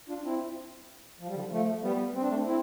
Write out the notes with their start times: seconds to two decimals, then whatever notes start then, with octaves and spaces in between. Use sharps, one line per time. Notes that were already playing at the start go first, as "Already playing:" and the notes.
0.09 D4 F4
0.25 C4 E4
1.20 F3
1.28 G3
1.35 D3 F3
1.52 F3 A3
1.83 G3 B3
2.14 C4
2.22 D4
2.29 A3 C4
2.46 C4 E4